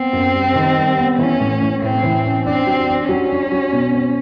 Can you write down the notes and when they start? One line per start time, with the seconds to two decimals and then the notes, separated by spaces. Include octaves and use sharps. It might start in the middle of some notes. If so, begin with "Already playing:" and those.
Already playing: B3 C4
0.13 F#2
0.34 G3
0.55 D#3
0.77 G3
0.98 B3
1.18 E3 C#4
1.40 A2
1.61 A2
1.82 A2 C4
2.03 E3
2.25 C#4
2.46 C4 D4
2.67 F#3
2.88 D4
3.09 F#3 C#4
3.30 D4
3.52 F#3
3.72 B2
3.94 C4